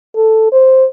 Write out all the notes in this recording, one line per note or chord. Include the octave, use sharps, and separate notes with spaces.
A4
C5